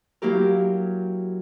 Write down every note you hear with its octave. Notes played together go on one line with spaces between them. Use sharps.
F#3 A#3 E4 G4 A#4